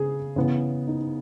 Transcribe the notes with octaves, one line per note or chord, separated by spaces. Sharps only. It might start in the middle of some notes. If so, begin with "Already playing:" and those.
Already playing: C#3 G#4
C#3 E3 B3
D#4